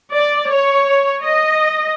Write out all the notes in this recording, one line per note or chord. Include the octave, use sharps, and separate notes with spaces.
D5
C#5
D#5